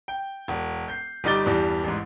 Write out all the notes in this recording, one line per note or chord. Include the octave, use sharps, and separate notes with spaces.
G5
E1
G6 C7
G1 G3 D#4 D6 A6 G7
E2 G2 G3
A1 G#2